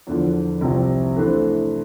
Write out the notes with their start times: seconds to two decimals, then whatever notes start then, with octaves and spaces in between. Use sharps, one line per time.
0.07 E2 D3 F3
0.61 C2 C3 F3 C4
1.16 E3 A3 D4 A4 C5